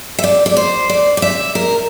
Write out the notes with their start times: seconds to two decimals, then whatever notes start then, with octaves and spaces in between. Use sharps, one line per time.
0.18 E5
0.24 D5
0.46 D5
0.57 C5
0.89 D5
1.17 D5
1.22 E5
1.55 A#4